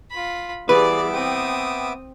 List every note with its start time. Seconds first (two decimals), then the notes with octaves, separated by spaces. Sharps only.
0.11 F4 B5
0.69 E3 G3 B3 G#4 B4 D5 E5 D6
1.14 C4 G5 D#6